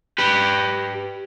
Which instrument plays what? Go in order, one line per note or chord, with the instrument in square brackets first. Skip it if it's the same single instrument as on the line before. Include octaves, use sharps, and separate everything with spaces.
[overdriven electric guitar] G4 B4